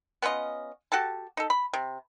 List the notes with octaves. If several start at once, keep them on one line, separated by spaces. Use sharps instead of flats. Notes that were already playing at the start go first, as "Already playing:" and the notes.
B3 C#4 F4 D#5
F#4 G4 A4 A5
D#4 A4
B5
C3